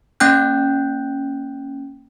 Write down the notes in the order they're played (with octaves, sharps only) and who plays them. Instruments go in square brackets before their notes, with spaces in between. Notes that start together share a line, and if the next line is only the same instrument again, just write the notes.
[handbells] A#3 C#4 G5 F#6 G6